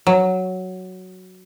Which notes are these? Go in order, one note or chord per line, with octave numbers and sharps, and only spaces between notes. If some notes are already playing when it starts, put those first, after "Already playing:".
F#3